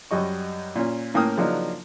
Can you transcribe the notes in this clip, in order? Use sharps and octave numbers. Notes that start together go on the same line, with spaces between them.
F#2 G3 D#5 C#6
A#2 C#4
A2 A#3 C#4 G5 D#6 F6
C#3 F3 F#3 A#3 D4 D#4